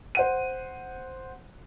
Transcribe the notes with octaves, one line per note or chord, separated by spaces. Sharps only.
C5 F#5 D#7